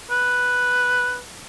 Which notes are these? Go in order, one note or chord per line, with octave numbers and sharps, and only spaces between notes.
B4